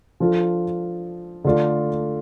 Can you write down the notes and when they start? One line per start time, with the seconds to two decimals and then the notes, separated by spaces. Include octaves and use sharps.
0.20 F3 D4 F4 A4
1.44 D3 A3 F4 D5